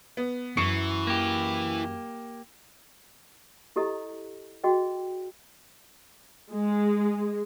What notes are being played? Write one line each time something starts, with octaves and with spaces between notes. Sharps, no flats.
B3
F#2 E3 C#6 C7 C#7
A#3 G4
E4 G4 A4 D#5 A#5
F#4 G#4 D#5 G5
G#3